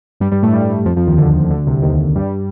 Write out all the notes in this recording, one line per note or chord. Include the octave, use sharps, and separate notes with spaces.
G2 G3
G2 G3
A2 A3
G2 G3
F2 F3
F2 F3
D#2 D#3
D2 D3
D2 D3
C2 C3
D#2 D#3
G2 G3